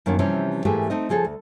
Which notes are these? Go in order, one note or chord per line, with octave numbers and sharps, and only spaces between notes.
F#2 D#3 A#3 C#4 D4
C3 E3 F3 G3 C4 C#4
G#2 E3 A3 A#3 G4 G#4
A3 C4 D#4 D#5
C#3 F3 G#4 A4
D2